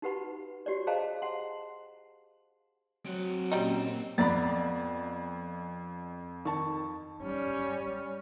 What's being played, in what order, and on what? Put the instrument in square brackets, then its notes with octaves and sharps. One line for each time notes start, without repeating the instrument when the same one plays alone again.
[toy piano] D#4 F#4 G4 B4 F#5 B5
F#4 G4 C#5 D5
G#4 C5 D#5 F5 A5 A#5
F#5 C6
[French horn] F#3 [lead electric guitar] C4 F#5
[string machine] A#2 A#3 C#4 [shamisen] G3 D#4
[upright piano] F2 [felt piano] B3 B5 [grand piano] D5 A#5 A6
[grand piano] D#3 [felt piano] A5 C#6
[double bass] G3 C#4